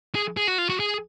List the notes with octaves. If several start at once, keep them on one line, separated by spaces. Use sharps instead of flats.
G#4
G#4
F#4
F4
F#4
G#4